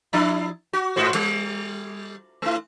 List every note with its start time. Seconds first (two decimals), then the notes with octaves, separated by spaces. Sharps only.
0.13 F3 D4 E4
0.73 F#4
0.96 G#2 F#4 C5
1.15 G3
2.42 A3 E4